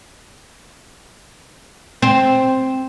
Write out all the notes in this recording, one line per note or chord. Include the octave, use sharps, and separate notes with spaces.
C4